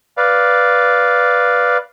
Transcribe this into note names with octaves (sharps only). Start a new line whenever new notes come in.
B4 D5 F5